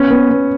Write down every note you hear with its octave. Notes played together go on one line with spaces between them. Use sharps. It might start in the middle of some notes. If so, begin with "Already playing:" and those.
Already playing: B3 C#4
B3
B3